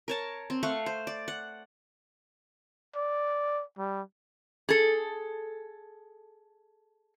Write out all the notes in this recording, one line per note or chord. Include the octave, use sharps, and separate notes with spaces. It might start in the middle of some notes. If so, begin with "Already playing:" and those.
A#4 C#5 A5
C4
A3 F5 F#5 C#6
C5
D5
F#5
D5
G3
G#4 A4